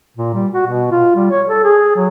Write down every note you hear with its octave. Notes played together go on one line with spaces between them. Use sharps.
A#2
G3
F#4
B2
F4
G3
C#5
A4
G#4
F#3